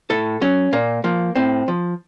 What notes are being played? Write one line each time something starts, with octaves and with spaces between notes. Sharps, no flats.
A2 A4
F#3 C#4
A#2 A#3
F3 A#3
A2 C4
F3